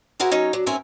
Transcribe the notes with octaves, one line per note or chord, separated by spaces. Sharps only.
E4 F#4 G#4 A#4 C5
F#3 C#4 D#4 C#5
F#3 D4
G#2 C4 C#4 A#4 E5 G#5